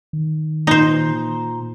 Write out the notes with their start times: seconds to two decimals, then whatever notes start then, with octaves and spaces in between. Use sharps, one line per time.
0.13 D#3
0.67 A#2 D#4 C5